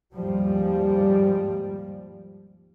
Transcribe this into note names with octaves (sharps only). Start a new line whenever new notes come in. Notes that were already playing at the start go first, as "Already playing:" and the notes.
D#2 G#2 F3 G3